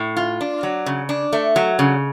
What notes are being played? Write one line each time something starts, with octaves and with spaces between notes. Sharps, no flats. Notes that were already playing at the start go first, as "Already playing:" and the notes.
Already playing: A2
F4
D4
F#3
C#3
D4
A3
F#3
C#3